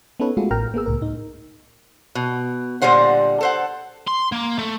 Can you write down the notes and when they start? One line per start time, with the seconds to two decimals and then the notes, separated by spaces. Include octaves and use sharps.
0.20 B3 C#4 D#4 A4 B4 C#5
0.37 G#3 A3 F4 F#4 G#4 A4
0.51 A1 A2 A#4 G5 A#5 F6
0.74 A#3 B3 G#4 E6
0.86 C#2 A2 A#4
1.02 A2 D#4
2.15 B2
2.82 A#2 D3 G3 C5 F#5
3.41 A4 C5 F#5
4.08 C6
4.32 A#3
4.58 A3